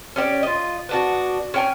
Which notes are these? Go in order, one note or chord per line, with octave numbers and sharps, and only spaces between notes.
C#4 G4 C#5 D5
F4 D#5
B3 D4 F#4
C#4 G5 G#5